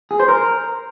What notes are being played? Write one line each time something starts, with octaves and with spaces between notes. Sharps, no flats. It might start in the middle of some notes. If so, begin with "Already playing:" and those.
G#4
C5
A#4